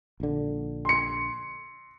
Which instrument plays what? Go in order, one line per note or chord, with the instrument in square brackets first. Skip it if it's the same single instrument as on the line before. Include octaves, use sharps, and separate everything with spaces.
[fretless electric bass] A#1 D3
[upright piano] C6 C#7